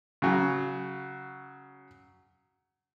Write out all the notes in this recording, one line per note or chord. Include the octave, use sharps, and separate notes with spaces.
C#3 F#3